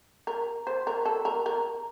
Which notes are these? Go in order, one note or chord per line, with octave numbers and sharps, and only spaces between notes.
A#4
C5
A#4
A4
A#4
A#4